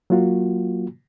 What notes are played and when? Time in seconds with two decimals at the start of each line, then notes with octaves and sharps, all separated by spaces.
0.10 F#3 A#3 F4 F#4